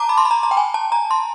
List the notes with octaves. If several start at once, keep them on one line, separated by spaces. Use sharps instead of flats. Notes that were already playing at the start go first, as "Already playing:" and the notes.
Already playing: A5 A#5 D6
B5
C6
B5
A#5
A#5
G5
G#5
A5
A#5
C6